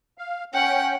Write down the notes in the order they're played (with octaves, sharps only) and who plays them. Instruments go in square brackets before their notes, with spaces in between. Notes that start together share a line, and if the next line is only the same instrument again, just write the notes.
[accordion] F5
[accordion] C#4 G5 [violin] F#5